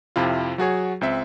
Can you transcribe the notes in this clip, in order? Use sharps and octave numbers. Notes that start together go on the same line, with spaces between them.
F2 C3 E4 F4
F#3 F#4 G#4 C#5
C#2 C4 E5